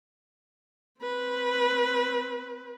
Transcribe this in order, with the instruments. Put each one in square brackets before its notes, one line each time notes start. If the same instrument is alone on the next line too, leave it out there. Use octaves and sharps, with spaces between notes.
[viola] C4 B4